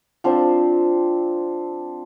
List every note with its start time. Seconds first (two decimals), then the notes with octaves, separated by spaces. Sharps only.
0.24 F3 C4 D4